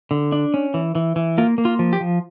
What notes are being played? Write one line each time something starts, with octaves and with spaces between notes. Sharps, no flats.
D3
D4
C#4
E3
E3
E3
A#3 F4
A#3
F4
F3
G4
F3